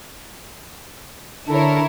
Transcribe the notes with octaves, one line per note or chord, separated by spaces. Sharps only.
D3 E4 A4 A#4 C#5